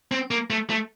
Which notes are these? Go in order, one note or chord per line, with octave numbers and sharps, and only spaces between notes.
C4
A#3
A3
A3